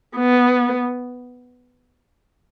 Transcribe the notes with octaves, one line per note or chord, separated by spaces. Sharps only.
B3